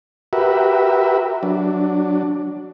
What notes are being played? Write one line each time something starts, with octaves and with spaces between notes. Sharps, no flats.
F#4 G4 A#4 B4 E5
F#3 D4